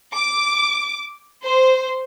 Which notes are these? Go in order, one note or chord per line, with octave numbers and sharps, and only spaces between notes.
D6
C5